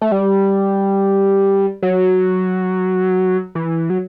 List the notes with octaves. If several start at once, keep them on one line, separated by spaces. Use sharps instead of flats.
A3
G3
F#3
E3
F#3